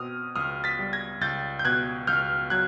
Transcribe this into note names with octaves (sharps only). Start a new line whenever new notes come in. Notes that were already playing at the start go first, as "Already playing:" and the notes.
Already playing: B2 C4 D#6 F6
C#2 D#6 F6
A6 B6
G3
G#6 A#6
C#2 G6 A6
G6
B2 F#6 G#6
C#2 F6 G6
F#3 F#6 G#6